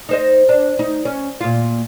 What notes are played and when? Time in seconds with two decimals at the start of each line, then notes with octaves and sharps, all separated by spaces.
0.09 D#4 C5 D#5
0.49 D4
0.79 D#4
1.05 C#4
1.40 A#2 F4